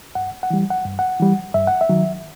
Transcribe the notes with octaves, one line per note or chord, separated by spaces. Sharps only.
G2 F#5
F#5
E3 G3
F#5
G2
F#5
E3 G3
G2 E5
F#5
E5
D#3 F#3